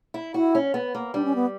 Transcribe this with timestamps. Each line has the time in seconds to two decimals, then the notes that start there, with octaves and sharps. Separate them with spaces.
0.14 E4
0.34 E4 F#4
0.55 C#4
0.74 B3
0.95 A#3
1.14 G3 D4
1.25 C#4
1.35 B3